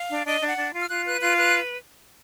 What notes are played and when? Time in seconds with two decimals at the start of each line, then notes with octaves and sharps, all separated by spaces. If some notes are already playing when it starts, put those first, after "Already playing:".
Already playing: F5
0.09 D4
0.25 D4 D#5
0.41 D4
0.47 F#5
0.57 D4
0.73 F4
0.80 F6
0.89 F4 F#6
1.04 B4 F#6
1.21 F4 F#6
1.36 B4 F#6